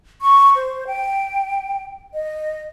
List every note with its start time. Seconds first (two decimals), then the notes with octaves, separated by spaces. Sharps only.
0.22 C#6
0.56 C5
0.87 G5
2.13 D#5